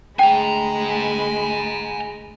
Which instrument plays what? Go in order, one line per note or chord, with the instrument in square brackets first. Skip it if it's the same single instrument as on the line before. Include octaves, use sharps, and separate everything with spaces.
[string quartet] D2 G#3 B5 [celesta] G5 [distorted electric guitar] G#5 A#5